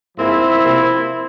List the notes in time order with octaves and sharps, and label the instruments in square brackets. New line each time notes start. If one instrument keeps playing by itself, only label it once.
[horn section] G#2 F3 A#3 C4 E4
C3 F3 A#3